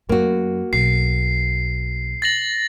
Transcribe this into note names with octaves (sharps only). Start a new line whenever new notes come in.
F#2 A#3 F#4
B1 C7
A6 A#6 F#7